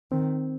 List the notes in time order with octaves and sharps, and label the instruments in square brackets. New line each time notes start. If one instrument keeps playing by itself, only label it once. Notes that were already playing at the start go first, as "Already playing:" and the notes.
[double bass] D#3 [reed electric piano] C4